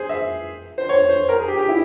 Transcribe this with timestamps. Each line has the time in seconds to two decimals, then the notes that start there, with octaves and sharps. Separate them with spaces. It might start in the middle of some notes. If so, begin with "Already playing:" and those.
Already playing: G#4 C5
0.09 E5
0.78 C5
0.89 C#5
1.09 C5
1.29 A#4
1.38 G#4
1.48 G4
1.59 G4
1.69 E4